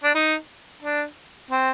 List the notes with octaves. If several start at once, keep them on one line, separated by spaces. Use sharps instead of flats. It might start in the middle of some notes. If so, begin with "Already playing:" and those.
D4
D#4
D4
C4